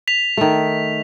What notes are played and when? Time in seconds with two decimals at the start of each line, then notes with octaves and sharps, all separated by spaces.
0.08 B6 F7
0.37 D#3 A3